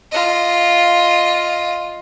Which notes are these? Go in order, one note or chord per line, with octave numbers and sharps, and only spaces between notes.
F4 D#5